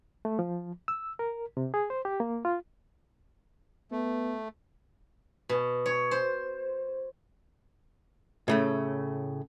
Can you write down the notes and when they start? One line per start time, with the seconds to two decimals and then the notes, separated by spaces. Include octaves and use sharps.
0.25 A3
0.39 F3
0.88 E6
1.19 A#4
1.57 C3
1.74 G#4
1.90 C5
2.05 G4
2.20 A#3
2.45 F4
3.91 A3 B3
5.49 B2
5.86 C#5
6.11 C5
8.48 A2 C#3 A3